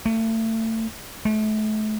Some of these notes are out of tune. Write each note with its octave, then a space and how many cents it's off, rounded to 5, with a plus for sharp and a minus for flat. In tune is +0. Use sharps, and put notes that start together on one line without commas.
A3 +30
A3 -35